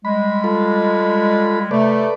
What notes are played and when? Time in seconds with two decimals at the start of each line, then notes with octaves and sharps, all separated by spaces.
0.05 G3 G#3 B5
0.44 F4 A4 B5
1.71 C3 A3 A4 B4 D5